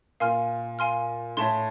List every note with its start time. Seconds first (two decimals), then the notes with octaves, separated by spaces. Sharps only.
0.20 A#2 F5 G#5 C6 F6
0.79 F5 G#5 C6 F6
1.37 A2 C#5 E5 A5 C6